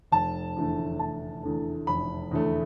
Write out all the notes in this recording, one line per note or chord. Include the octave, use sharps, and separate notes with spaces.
F1 A5
E2 D3 A3
F1 A5
E2 D3 A3
F1 B5
E2 D3 A3